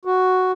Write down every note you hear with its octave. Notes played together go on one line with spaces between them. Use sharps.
F#4